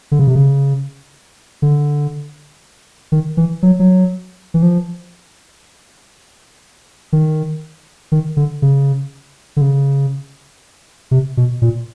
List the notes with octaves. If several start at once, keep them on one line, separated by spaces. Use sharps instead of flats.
D3
C#3
C3
C#3
D3
D#3
E3
F#3
F#3
E3
F3
D#3
D#3
D3
C#3
D3
C#3
C3
B2
A#2